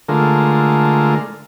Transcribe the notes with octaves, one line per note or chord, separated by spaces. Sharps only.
D3 G#3 A3 F4 A#4